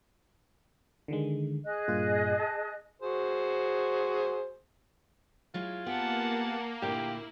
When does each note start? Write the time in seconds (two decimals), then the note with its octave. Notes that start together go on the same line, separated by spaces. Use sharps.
1.08 D3 D#3 G#3
1.64 G#4 D#5 F#6
1.88 G2 A#2 F4
2.40 A5
3.02 F#4 G#4 C5
5.54 F#3 G#3 E4 F4
5.86 A#3 B3 G4 G#4 F#5 A5
6.82 D2 A#2 E4 G4